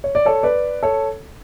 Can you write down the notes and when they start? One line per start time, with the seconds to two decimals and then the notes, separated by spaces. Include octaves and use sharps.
0.04 C#5
0.15 D5
0.26 A4 C#5
0.43 B4 D5
0.83 A4 C#5